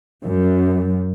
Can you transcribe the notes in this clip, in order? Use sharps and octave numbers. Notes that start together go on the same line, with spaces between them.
F#2